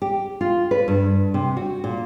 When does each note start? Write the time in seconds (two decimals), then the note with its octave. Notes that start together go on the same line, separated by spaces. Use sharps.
0.02 G4
0.41 F4
0.71 B4
0.88 G2
1.34 C3
1.57 F#4
1.84 A#2